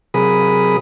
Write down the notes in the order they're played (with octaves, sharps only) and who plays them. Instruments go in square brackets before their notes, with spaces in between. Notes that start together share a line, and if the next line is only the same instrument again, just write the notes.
[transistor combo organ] C3 F#3 G#4 A#4 B5 D#6